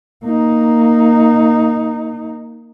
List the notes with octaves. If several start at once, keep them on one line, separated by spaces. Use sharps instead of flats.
A#3 D#4